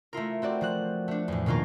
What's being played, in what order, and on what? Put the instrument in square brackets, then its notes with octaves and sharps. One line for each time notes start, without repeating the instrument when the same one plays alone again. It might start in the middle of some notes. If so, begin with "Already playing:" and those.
[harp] A3 E4 F4 A#4
C4 F#4 D5
F3 F#4 F#6
A3 D4
E2 A2
B2 D#3 A#3 F4 A#4